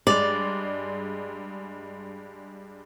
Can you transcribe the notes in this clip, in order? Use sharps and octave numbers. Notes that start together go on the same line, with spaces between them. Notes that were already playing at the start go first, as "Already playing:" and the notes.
G2 G#3 D5 F7